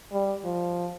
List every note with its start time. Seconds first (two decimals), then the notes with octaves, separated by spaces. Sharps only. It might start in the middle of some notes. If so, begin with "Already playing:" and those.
0.13 G3
0.45 F3